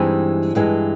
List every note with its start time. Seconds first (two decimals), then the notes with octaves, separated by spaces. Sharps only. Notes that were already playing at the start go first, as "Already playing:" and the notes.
Already playing: G2 E3 G#3 C4 D#4
0.55 G2 E3 G#3